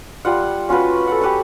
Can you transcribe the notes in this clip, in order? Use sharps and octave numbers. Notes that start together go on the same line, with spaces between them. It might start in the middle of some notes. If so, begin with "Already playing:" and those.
G3 F4 F#5
C#4 F4 F#4 B4
A4 F#5
G4 B4 F#5 A5